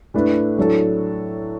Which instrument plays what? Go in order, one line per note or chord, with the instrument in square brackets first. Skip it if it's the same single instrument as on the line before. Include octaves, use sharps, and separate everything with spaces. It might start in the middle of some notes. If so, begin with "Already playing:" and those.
[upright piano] A2 A3 D4 B4
A2 F#3 D4 A4